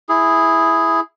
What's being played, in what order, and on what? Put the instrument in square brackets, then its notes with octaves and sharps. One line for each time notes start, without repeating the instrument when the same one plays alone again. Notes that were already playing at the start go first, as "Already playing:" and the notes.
[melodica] E4 G#4